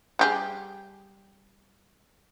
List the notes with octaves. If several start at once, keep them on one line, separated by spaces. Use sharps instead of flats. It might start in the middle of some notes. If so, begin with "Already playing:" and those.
G3 G4 G#4